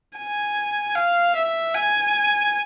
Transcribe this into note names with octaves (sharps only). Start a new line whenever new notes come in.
G#5
F5
E5
G#5